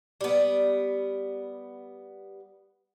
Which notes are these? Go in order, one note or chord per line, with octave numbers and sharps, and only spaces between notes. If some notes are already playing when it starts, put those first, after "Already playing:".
G3 B3